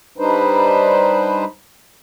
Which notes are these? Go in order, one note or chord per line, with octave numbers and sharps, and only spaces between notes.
G3 D4 D#4 B4 C5